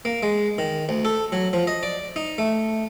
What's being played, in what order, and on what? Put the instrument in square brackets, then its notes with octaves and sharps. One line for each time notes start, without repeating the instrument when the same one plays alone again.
[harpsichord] A#3
G#3
D#3
D2
A4
F#3
F3
D#5
D5
D#4
A3